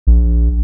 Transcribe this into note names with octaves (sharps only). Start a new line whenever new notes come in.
A#1